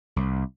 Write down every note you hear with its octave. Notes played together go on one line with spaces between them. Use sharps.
C2